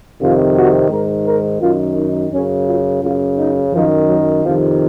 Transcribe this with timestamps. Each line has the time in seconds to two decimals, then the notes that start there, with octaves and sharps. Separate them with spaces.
0.20 F2 C3 D#3 F4
0.56 F#4
0.90 G#2 D#3 A#4
1.25 A#4
1.61 F#2 D#3 F4
1.96 D#4
2.31 F#2 C#3 C#4
2.67 F4
3.02 F#2 C#3 F4
3.37 D#4
3.72 F#2 D#3 F3
4.07 F#3
4.43 F2 C3 D#3 F3